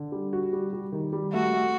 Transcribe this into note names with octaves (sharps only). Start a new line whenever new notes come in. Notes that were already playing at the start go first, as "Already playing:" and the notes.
Already playing: D3
G3
F#4
G3
G3
D#3
G3
A3 F#4
A3